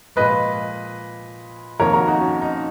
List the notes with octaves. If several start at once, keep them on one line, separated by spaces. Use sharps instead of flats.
A#2 F3 G#3 B4 D#5
F2 D#3 A#3 A#4 C#5
F#4 A#4
D#4 F#4
C#4
D#4